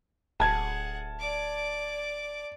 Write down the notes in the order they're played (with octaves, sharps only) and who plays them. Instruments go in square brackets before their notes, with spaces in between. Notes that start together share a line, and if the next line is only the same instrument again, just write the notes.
[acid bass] D1 [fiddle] G#4 F#5 [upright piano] A5 G#6
[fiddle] D5 D6